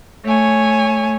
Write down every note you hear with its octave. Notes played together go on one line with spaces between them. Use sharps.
A3 C#5 G#5